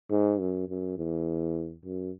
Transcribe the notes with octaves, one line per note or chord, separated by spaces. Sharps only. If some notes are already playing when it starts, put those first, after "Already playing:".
G#2
F#2
F#2
E2
F#2